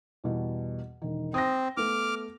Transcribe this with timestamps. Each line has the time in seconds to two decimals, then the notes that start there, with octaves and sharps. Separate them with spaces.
0.24 E2 B2 G3
1.02 E1 D#3
1.34 C4 D#6 A#6
1.77 A3 B3 D6 F6